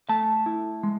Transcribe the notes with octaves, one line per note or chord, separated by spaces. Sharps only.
A3 A5
E4
G#3